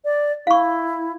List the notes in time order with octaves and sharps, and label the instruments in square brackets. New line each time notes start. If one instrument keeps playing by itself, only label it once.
[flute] D5
[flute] E4 [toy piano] F5 C#6